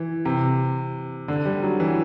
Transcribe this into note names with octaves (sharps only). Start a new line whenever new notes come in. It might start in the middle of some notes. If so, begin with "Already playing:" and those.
Already playing: E3
C3
D3
G3
F#3
E3